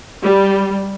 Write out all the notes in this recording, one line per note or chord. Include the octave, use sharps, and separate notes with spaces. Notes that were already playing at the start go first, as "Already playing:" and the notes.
G3